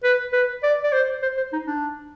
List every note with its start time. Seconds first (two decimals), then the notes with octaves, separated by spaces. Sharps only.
0.03 B4
0.33 B4
0.63 D5
0.84 D5
0.92 C5
1.23 C5
1.37 C5
1.53 D#4
1.67 D4